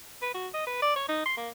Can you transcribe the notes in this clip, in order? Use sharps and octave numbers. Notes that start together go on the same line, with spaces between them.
B4
F#4
D#5
B4
D5
C#5
D#4
C6
A#3